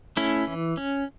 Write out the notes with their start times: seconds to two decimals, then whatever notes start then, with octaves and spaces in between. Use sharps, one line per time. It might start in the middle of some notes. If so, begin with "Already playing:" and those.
0.17 A3 C#4 E4
0.47 E3
0.77 C#4